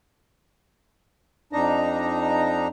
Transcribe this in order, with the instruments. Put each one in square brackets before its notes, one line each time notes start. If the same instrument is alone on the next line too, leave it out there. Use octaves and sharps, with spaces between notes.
[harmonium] F2 D4 D#4 A#5